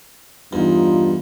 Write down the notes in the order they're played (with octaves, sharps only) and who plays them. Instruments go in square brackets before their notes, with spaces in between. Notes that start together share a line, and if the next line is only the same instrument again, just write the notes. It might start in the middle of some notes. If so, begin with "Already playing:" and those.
[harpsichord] E2 [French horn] G2 [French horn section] D#4 F4